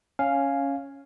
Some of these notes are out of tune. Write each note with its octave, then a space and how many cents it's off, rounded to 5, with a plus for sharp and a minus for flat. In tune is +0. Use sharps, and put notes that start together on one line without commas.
C#4 +0 F5 +0 G#5 +0